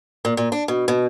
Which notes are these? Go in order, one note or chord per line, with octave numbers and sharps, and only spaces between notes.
A#2
A#2
D4
B2
B2